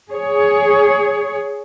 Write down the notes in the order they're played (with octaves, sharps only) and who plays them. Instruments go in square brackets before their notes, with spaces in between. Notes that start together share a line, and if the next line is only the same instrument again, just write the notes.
[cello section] G#4 C#5